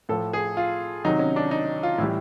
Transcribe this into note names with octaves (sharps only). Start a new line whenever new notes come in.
A2 F3 A4
G#4
F4
C3 D#3 F#3 D#4
C#4
D4
D#4
F4
A2 E3 G3 E4